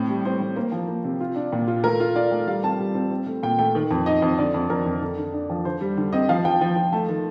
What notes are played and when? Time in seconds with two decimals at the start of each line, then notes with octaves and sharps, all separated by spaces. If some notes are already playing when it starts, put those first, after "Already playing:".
Already playing: A2 C4
0.09 G3
0.25 C4 C5
0.40 A2
0.56 A#3 C5
0.72 F3
0.88 A#3
1.04 C3
1.20 F4
1.36 D4
1.53 A#2
1.67 F4
1.84 A3 A#4
2.00 F4
2.16 F4 D5
2.32 A3
2.47 G3 F5
2.63 C4 A5
2.79 G3
2.95 C4
3.10 C4
3.27 A3
3.43 A#2 G5
3.59 A3 G5
3.75 D#3
3.91 F2
4.06 D#4 D#5
4.22 F2
4.38 D3 D5
4.54 F2
4.70 F2 A#4
4.86 F2
5.01 D3 A4
5.18 D3
5.34 D4
5.50 F3
5.65 D3 C5
5.81 G3
5.97 D3
6.13 C4 D#5
6.29 F3 F5
6.45 F3 G5
6.61 F3
6.76 F3
6.92 A3 A5
7.09 D#3